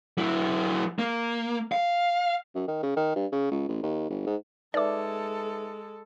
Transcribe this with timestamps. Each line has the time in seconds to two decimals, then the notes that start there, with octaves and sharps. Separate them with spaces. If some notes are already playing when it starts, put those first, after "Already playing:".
0.18 F#3 E4
0.99 A#3
1.72 F5
2.55 F#2
2.68 D#3
2.83 C#3
2.96 D#3
3.15 G2
3.32 C#3
3.51 C#2
3.69 A1
3.82 D#2
4.10 G1
4.26 G#2
4.74 G#3 D#4 A4 B4 D5 E5 D6